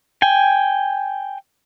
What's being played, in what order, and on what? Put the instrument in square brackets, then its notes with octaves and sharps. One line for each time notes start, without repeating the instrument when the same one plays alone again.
[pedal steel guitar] G5 G#5